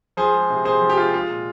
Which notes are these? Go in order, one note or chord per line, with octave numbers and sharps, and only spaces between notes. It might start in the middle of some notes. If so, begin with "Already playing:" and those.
F3 G#4 C5
G#3
C3
C3 G#4 C5
F3
G4
G#3 F4
G#3 F4
A#2